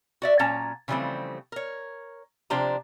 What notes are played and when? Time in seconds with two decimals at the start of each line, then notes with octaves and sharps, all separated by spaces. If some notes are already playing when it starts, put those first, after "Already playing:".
0.22 F#4 D5 E5
0.39 A#2 F#3 C#4 A5 A#5
0.88 C#3 E3 F3 G3 A3 C4
1.52 A#4 C#5
2.50 C3 F3 D4 G4 C5 A#5